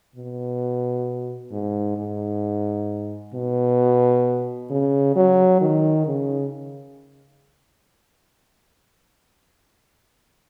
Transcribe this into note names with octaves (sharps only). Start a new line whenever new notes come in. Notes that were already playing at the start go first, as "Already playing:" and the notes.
B2
G#2
G#2
B2
C#3
F#3
D#3
C#3